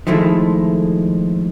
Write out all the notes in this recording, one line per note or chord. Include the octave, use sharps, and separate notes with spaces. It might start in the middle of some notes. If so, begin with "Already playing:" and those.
D#3 F3 G#3 A3 E4